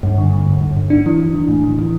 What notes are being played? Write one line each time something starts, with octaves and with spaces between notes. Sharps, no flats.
G2
D3
D3
G2
G2
G2
D4
E3
E3
E3
A2
E3
E3